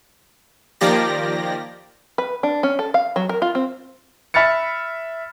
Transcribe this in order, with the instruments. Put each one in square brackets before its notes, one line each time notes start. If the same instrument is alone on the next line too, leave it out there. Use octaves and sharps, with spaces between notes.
[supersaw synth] D#3 F3 A#3 G4 D5 A#6
[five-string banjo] B4
D4
C#4
A4
F5
F#3
A#4
F4
C4
[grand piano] E5 B5 F6 A6 C#7